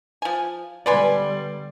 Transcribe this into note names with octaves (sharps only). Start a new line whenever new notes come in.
F3 G#5
D3 G3 B3 B4 D5 G#5 C6